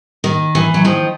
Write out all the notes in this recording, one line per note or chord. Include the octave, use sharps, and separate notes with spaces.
D#3
E3
F#3
D#3 F3